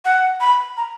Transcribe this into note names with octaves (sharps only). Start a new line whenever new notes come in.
F#5
B5
A#5